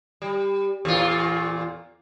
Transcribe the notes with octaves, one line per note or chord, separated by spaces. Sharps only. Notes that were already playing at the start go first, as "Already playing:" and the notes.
G3
E2 A#2 F4